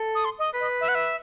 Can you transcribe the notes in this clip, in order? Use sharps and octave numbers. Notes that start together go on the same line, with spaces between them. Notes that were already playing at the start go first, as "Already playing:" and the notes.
Already playing: A4
D#6
C6
D#5
B4
D#5
E5
F#5
E5